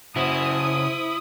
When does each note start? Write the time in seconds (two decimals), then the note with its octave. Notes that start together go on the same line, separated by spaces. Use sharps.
0.16 C#3 E4 F#4 C5 D#6